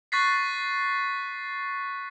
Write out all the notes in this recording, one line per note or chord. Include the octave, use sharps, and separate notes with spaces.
C#6 F#6 A6 B6 C7